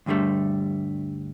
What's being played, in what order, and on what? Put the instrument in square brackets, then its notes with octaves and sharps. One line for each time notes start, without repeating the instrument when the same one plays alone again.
[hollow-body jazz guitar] D2 G2 D3 G3 A3